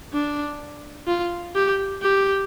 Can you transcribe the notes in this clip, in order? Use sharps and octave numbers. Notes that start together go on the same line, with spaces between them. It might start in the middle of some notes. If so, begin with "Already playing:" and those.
D4
F4
G4
G4